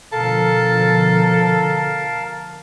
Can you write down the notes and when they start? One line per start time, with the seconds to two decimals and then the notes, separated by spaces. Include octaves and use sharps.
0.12 B2 D3 F3 A4 A#4 F5 A5